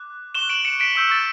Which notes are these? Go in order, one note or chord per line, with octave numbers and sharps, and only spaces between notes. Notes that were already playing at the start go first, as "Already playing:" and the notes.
Already playing: D6 F#6
C#6 F#6 E7 G7
D7 F#7
C#7 E7
B6 D7
C#6 E6 G6 B6
A6